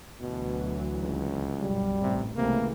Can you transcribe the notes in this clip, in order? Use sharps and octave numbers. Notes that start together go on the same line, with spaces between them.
D2 B2 E3 F#3
C#2
B1 F#2 G3
A1 C3
C#2 C3 E3 A3 A#3